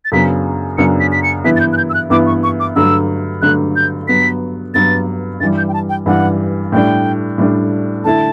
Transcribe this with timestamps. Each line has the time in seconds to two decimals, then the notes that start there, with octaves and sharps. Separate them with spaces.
0.05 A6
0.12 F#2 C#3 F#3 B3 D4 B6
0.78 F#2 C#3 F#3 B3 D4 C#7
1.00 B6
1.12 B6
1.23 C#7
1.44 G2 E3 B3 E4 B6
1.56 A6
1.60 G6
1.73 F#6
1.77 G6
1.90 E6
1.94 F#6
2.10 G2 E3 B3 E4 D6
2.26 C#6
2.43 C#6
2.60 D6
2.76 G2 D3 F#3 A3 E6
3.42 G2 D3 F#3 A3 F#6
3.76 G6
4.08 G2 F#3 B3 B6
4.74 G2 F#3 B3 A6
5.40 G2 E3 G3 A6
5.58 G6
5.69 G5
5.74 A5
5.89 G5
6.06 G2 E3 G3 F#5
6.72 A2 G3 D4 G5
7.38 A2 G3 D4
8.04 D3 A3 E4 A5